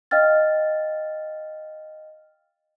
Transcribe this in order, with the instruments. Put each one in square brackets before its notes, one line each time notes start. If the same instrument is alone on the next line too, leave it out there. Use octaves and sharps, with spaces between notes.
[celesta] D#5 F5 G5 F6 A6